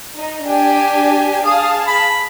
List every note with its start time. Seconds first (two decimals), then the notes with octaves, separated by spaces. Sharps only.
0.16 D#4
0.47 D4 G4 G#5
1.45 G#4 F5 A5 D#6
1.87 B5